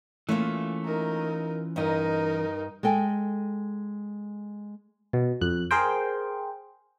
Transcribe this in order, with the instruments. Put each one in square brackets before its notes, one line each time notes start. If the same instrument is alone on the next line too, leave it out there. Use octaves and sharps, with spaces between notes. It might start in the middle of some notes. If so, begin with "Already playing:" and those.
[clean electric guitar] E3 C#4 F4 [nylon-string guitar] A3 A#3
[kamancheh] D#4 A#4
[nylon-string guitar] G2 D#5 [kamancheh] D#4 A#4
[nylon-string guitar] G#3 A4 G5 G#5
[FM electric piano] B2
F2 F#6
G#4 A#4 C5 G5